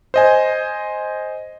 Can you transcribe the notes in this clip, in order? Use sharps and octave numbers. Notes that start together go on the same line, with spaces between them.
C5 D#5 G#5